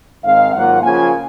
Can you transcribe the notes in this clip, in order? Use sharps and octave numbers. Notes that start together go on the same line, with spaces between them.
G#2 D#3 G#3 C4 F5
G#2 D#3 F#3 A#3 F4 F#5
C#3 F3 A#3 F4 G#5